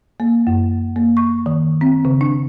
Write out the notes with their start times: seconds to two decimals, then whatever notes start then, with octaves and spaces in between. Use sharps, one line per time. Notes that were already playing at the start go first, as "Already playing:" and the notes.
0.20 A#3
0.47 F#2
0.96 A#3
1.17 C#6
1.46 D#3
1.81 C4
2.05 C#3
2.21 D4